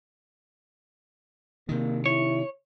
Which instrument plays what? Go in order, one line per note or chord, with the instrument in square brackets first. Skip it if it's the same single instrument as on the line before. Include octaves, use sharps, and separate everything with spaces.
[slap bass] C3 D#3 [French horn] A#3
[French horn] E4 [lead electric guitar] C#5